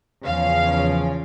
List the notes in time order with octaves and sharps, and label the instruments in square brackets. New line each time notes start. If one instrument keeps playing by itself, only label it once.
[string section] E2 C#3 F3 C#4 F5